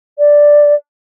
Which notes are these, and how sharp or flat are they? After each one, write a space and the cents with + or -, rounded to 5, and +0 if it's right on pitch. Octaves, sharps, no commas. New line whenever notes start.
D5 +0